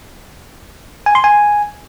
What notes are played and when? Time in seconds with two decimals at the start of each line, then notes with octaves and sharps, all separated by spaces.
1.06 G#5
1.15 C6
1.24 G#5